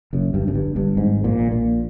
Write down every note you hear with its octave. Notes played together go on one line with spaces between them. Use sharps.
F#1 F#2
G1 G2
F#2
G1 G2
G1 G2
G#1 G#2
A#1 A#2
A#1 A#2